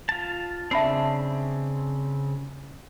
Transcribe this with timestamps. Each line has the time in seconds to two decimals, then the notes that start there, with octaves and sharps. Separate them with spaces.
0.09 F4 A5
0.71 C#3 C4 D4 E5 B5 C7